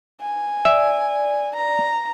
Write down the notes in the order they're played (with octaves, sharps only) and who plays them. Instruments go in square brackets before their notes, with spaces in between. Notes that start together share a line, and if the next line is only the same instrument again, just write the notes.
[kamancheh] G#5
[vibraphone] D5 [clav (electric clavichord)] E5
[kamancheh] A#5